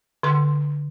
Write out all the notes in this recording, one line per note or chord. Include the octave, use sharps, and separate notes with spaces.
D3 C6